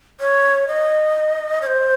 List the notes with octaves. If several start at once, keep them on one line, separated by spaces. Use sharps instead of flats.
C#5
D#5
C#5
C5